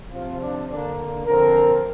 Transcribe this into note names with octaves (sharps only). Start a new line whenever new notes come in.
C3 F3 C4 F4
D4
D3 A#3 D4
D3 F3 C4 A#4